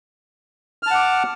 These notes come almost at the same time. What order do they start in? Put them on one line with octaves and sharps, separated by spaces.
F6 A5 F#5 D6